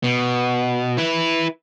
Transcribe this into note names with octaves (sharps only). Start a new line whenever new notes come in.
B2
E4 B4